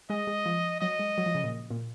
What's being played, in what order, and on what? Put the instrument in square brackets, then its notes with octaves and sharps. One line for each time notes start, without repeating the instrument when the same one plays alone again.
[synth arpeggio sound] G#3 [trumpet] D#5
[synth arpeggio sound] G#3
F3
[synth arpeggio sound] F#3 [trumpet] D#5
[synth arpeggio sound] G#3
F#3
F3
C#3
A#2
A#2